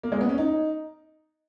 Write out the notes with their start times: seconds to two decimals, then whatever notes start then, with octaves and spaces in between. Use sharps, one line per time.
0.03 A#3
0.12 G#3
0.21 B3
0.29 C#4
0.38 D#4